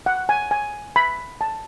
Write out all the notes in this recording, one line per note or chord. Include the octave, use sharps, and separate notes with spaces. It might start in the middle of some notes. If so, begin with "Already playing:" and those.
F#5
G#5
G#5
B5
A5